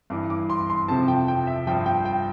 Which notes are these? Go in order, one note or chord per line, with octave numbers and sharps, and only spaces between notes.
G2 E3 D6
D6
C6
C6
F2 C3 F3 A5
G5
G5
E5
G2 F3 G5
G5
G5